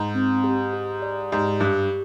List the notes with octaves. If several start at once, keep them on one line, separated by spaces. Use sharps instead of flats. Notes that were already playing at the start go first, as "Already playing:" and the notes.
Already playing: G#2
C4
G4
G4
D5
G#2 G4
G2 G4